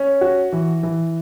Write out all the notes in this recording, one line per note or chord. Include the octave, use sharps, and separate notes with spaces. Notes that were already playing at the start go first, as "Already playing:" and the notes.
Already playing: C#4
F#4
E3
E3